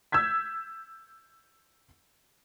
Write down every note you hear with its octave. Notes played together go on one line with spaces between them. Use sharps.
E6 G6 G#6 B6